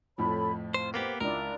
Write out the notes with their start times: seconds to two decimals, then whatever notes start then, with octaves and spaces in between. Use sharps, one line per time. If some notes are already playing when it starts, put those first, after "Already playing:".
0.18 F2 A2 F3 A4 C#5 B5
0.74 F4 C5
0.94 A#3 B3 G4 C5
1.20 C#2 D4 E4 F4 A#4